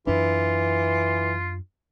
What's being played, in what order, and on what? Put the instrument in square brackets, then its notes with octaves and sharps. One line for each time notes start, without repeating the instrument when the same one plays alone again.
[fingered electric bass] F#2 D4 [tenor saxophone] E3 [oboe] F4